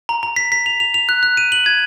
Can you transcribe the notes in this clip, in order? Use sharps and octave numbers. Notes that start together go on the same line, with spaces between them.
A#5
A#5
B6
B6
F7
F7
F7
F#6
F#6
D#7
F#7
G#6